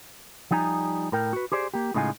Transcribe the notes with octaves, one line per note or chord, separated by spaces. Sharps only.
F3 G3 D#4 G#5 A#5
A2 A#4 G5
F#4 B4
G4 G#4 C5 D5
A#3 G4
A2 C#3 G#3 D#4 F4 G#5